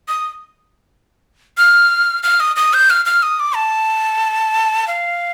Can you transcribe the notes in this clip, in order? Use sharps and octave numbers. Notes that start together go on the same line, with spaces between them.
D#6
F6
F6
D#6
D#6
G6
F6
F6
D#6
D6
A5
F5